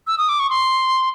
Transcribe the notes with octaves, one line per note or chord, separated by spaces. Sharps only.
E6
D#6
D6
C#6
C6